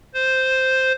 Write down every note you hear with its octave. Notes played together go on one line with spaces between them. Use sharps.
C5